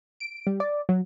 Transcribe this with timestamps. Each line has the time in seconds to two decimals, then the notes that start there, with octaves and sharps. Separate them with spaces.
0.20 D7
0.47 G3
0.60 D5
0.89 F#3